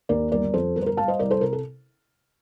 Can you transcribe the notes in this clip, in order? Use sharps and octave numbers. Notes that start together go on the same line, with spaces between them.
D#2 A#4 D5
G1 A#4 D5
F2 A4 C5
G1 A#4
C5
A#4
G3 F5 A5
C5 D#5
C2 A#4 D5
A4 C5
C3 A#4
A4